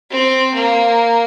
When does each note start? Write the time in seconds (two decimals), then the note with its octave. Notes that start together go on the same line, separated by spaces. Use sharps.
0.10 C4
0.54 A#3